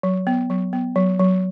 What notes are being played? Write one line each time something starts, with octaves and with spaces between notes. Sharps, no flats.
F#3
B3
F#3
B3
F#3
F#3